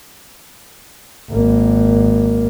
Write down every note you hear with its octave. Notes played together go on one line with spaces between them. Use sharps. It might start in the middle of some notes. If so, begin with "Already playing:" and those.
G#1 A#3